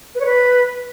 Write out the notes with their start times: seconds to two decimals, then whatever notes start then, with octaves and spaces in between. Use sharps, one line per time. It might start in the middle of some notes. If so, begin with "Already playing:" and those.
0.15 B4
0.20 C#5
0.26 B4